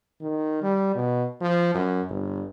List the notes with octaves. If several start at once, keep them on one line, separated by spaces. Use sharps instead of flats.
D#3
G3
B2
F3
F#2
G1